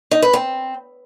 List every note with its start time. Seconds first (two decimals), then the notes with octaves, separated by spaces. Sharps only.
0.11 D#4
0.22 B4
0.33 C4